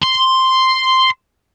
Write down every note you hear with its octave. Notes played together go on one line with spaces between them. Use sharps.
C6